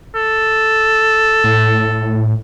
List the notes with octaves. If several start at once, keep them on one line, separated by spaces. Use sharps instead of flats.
A4
A2